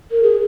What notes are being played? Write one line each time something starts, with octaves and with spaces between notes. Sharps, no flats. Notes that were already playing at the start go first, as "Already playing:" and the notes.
A#4
G#4